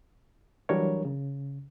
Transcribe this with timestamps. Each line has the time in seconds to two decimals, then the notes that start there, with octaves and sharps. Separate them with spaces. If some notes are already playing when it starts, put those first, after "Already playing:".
0.69 E3 F#3 G3 D4 A#4 C#5
1.05 C#3